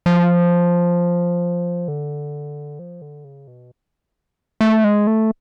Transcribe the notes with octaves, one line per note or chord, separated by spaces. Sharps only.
F3
D3
F3
D3
C#3
B2
A3
G#3
A3